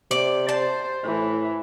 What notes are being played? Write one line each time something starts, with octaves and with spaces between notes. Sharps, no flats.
C3 D5
C5 A5
A2 E3